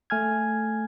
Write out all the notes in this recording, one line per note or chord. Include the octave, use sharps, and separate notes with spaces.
A3 G#5 F6 G#6